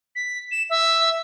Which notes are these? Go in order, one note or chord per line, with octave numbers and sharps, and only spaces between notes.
B6
E7
E5